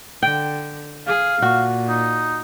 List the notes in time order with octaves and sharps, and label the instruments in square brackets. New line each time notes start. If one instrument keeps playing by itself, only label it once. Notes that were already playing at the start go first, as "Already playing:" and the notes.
[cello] D3 [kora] G5
[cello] G#4 [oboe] F5
[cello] A#2 [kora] F#4
[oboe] D#4